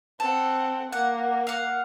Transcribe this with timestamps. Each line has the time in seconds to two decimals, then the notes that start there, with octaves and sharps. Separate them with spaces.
0.20 C4 A4 F#5
0.93 A#3 F#5
1.47 F5 F#5